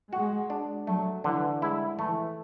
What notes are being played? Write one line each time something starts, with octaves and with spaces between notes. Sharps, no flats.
G#3 F#4
D4
F#3 A3
D3 E3
G#3 E4
E3 A3